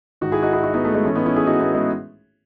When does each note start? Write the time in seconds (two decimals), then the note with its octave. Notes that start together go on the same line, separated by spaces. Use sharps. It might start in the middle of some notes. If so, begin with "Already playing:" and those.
0.21 G#2 D#3 D#4 F#4
0.32 E4 G#4
0.43 D#4 F#4
0.53 E4 G#4
0.64 D#4 F#4
0.74 B3 D#4
0.84 A3
0.94 G#3 B3
1.05 A2 E3 A3 C#4
1.15 B3 D#4
1.26 C#4 E4
1.36 E4 G#4
1.47 D#4 F#4
1.60 B3 D#4
1.74 G#3 B3